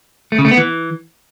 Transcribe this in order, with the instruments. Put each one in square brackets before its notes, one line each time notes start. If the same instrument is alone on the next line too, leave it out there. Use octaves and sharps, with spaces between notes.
[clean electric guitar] A3
C#3
A3
B3
E3